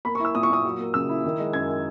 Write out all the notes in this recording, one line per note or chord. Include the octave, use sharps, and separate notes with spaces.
A#3 B5
C#6
E4
E6
A#2 D#6
C#6
A#2 D#6
F#3
A#3
C#3 E6
E4
D#3
G#3
F#2 G#6